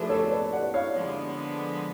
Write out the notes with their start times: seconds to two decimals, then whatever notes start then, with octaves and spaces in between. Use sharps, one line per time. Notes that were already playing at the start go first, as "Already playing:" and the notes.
Already playing: A2 F3 A3 D4 F#4 G#4 B4
0.09 A4 C#5
0.31 B4 D5
0.53 D5 F#5
0.74 C#5 F5
0.95 D3 F3 G#3 B3